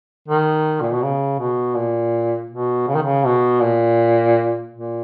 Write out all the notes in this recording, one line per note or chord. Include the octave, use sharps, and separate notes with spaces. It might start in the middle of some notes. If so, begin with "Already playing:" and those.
D#3
A#2
B2
C#3
B2
A#2
B2
C#3
D#3
C#3
B2
A#2
A#2